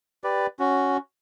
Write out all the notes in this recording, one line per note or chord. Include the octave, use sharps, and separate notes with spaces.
G4 B4 D5
C#4 F#4